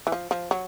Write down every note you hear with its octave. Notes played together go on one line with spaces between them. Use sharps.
E3
F3
F3
F#3